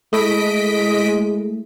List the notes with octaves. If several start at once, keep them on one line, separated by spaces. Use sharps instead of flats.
G#3 A3 E4 D#5 B6 D7